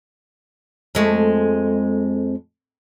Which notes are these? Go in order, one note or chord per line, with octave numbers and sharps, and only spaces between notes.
F2 G#3 A3